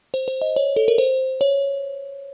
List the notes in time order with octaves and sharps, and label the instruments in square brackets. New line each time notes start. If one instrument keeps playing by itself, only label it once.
[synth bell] C5
C5
D#5
C#5
A4
A#4
C5
C#5